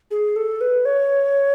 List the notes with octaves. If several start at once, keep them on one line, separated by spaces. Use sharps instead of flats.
G#4
A4
B4
C#5